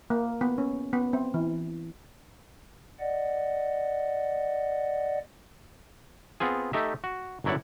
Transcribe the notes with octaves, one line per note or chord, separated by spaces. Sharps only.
A#3
B3
C#4
B3
C4
E3
D5 D#5 F#5
B3 C4 F4 G#4
A3 D#4 G4 E5
F#4
G1 F#2 F#3 E4 D5 F#5